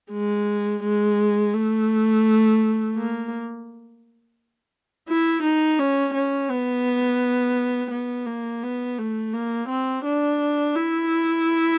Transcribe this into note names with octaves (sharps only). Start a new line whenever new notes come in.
G#3
G#3
A3
A#3
E4
D#4
C#4
C#4
B3
B3
A#3
B3
A3
A#3
C4
D4
E4